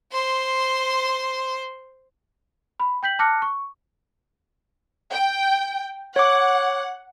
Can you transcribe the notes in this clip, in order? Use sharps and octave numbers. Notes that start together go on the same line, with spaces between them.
C5 C6
B5
G5 G6 B6 F#7
A5 D6 F6 F#6 A#6 C#7
C#6
G5
C#5 F#5 D6